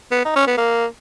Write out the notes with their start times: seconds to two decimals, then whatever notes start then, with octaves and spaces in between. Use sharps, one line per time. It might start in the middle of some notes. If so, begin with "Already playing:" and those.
0.12 B3
0.25 D#4
0.36 C#4
0.47 B3
0.58 A#3